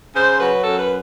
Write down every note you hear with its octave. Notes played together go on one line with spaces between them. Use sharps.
C#3 C5
F#3 B4
F#2 A4
B4